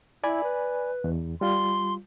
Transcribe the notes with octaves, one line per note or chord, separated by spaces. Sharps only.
E4 D5 G#5 B5
B4
E2
G3 F4 C6